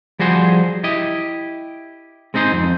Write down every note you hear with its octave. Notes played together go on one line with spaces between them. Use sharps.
F3 G3 F#4 G#4 C5
E4 G4 D#5
G#3 C4 D#4 G#4 C5
F2